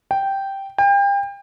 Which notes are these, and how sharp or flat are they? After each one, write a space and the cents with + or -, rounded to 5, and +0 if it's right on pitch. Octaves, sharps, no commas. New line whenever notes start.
G5 -5
G5 +35